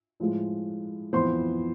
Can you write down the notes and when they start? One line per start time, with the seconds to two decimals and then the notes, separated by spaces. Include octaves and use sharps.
0.20 A2 F3 G#3
1.13 F2 E3 B3 C5 C6